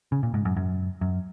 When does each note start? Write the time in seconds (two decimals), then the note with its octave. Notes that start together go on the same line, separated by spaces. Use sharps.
0.12 C#3
0.23 A#2
0.34 G#2
0.45 F#2
0.57 F#2
1.01 F#2